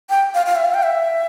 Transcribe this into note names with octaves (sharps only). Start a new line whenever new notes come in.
G5
F5
F5
E5
F5
G5
E5